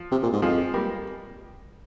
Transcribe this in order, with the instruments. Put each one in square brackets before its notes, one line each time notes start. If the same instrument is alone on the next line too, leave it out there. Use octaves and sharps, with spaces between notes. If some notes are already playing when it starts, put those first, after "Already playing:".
Already playing: [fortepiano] F3
[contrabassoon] C3
A#2
G#2
[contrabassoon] F2 [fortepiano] F3 G#3
[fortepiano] G3 A#3